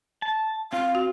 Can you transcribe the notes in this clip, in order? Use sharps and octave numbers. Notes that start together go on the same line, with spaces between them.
A5
C4 F4 F5
F#4